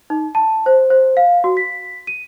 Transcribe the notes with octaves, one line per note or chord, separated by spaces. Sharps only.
D#4
A5
C5
C5
F5
F#4
B6
D#7